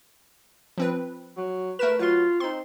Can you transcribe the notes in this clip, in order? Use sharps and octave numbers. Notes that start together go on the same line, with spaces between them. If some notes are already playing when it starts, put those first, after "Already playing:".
F3 C4 B4
F#3
A3 A#4 B4 E7
F#3 F4 B4 C6
C4 D#4 C6